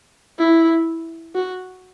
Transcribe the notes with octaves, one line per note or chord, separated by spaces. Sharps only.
E4
F#4